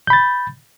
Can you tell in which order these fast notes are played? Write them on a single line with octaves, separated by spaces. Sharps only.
G6 B5 A6